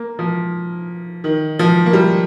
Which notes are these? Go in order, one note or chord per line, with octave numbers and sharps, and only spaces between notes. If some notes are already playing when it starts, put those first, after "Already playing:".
Already playing: A#3
F3
D#3
F3
A#3
G3